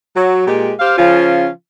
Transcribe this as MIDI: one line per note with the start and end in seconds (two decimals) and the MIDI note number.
0.16 0.44 54
0.47 0.72 46
0.47 0.72 56
0.47 0.72 67
0.80 0.97 67
0.80 0.97 72
0.80 0.97 77
0.98 1.48 49
0.98 1.48 53
0.98 1.48 61
0.98 1.48 65